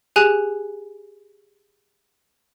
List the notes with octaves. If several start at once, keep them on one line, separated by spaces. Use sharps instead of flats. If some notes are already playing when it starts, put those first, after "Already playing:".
G4 G#4 G#5 F#6